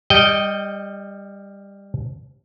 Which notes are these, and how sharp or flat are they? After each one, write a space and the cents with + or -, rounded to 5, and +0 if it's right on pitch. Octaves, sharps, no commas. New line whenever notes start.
G3 +20 D#5 +0 G5 -15